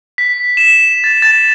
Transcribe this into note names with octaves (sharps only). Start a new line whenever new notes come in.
B6
E7
A6
A6